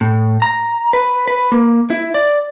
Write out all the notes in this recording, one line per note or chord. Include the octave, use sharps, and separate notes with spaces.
A2
A#5
B4
B4
A#3
E4
D5